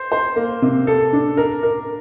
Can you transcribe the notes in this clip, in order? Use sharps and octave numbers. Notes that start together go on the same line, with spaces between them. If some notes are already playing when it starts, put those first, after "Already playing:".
Already playing: C5
C5
A#3
C3
A4
D4
A#4
A#4